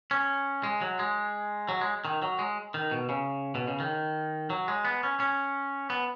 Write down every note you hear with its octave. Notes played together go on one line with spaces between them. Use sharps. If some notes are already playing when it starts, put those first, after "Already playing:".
C#4
G#3
F#3
G#3
F#3
G#3
D#3
F#3
G#3
D#3
B2
C#3
B2
C#3
D#3
F#3
G#3
B3
C#4
C#4
B3